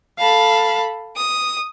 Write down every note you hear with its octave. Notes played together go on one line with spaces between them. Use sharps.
A4 F5 A5 B5
D#6